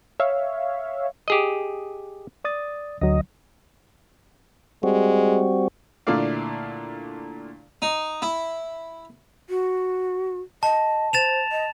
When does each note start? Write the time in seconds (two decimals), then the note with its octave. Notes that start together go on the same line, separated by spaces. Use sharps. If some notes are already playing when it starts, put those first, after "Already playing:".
0.20 C#5 E5 F5
1.28 G4 G#4 D#5
2.45 D5 D#6 A6
3.01 D2 D3 F#3 D#5
4.83 G3 G#3 C4 F#4
6.07 A#2 D3 A3 E4 D5 F5
7.82 D#4
8.22 E4
9.49 F#4
10.63 D#5 A5
11.13 C5 A6 E7 F7
11.52 D#5